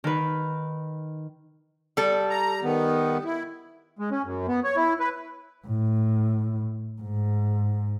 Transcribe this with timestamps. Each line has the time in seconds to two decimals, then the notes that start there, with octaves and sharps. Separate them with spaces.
0.04 D#3 B4
1.97 G3 A4
2.30 A#5
2.63 D#3 B3
3.24 E4
3.99 G#3
4.11 C#4
4.24 F#2
4.48 B3
4.64 C#5
4.76 E4
5.00 B4
5.67 A2
7.02 G#2